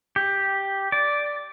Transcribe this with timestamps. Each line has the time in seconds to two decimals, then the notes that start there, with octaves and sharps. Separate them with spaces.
0.16 G4
0.92 D5